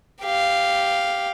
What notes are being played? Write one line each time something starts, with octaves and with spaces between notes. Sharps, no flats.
G4 F5